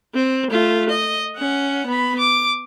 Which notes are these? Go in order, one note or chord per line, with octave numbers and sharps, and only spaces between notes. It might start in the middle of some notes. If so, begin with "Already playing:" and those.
C4
A3 F4
D#5
C#4 F#5
B3 B5
D6